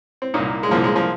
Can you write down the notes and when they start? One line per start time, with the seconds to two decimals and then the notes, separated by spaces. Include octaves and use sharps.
0.22 C4
0.34 C2 A#2 A#3 D#4
0.63 G#3
0.71 C2 A#2 F3 A#3
0.84 G#3
0.96 F3